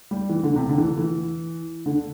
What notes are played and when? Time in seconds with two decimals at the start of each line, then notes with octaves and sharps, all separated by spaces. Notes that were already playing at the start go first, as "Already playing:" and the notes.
0.11 G3
0.30 E3
0.43 D3
0.56 C3
0.69 D3
0.78 E3
0.98 E3
1.86 D3